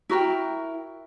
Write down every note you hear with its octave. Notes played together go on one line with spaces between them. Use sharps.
E4 F#4 A#4 G5